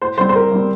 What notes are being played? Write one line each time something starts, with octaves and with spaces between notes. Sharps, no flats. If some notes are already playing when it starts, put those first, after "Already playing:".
A2 C5
G3 C4 C5
C5
A2 A#4
G3 C4